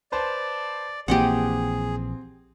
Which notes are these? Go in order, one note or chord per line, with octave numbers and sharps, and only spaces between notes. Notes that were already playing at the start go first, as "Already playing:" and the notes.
B4 C5 D5 A5
A#1 E3 A#3 C4 G4 G#4 D#5 F#5